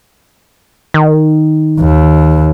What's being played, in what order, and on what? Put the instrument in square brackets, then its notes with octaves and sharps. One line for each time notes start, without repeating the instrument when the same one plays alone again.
[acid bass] D#3
[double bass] D#2